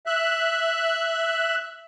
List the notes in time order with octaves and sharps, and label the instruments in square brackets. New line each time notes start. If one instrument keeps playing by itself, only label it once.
[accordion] E5 F#6